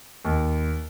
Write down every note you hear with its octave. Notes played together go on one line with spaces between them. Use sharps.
D#2